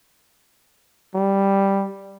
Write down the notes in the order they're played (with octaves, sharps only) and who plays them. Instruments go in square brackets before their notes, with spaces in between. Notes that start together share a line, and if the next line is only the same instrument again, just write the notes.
[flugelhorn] G3